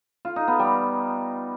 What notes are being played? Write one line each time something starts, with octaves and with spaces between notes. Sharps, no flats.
F4
D#4
B3
G3